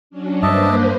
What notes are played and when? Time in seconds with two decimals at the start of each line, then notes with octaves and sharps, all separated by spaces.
0.10 F#3 C#4 D4
0.42 G2 A#3 D4 B4 C5 D#5 E5 A5